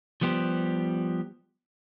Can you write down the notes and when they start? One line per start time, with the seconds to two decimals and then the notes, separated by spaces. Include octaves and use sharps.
0.21 F3 G3 B3 G4 C5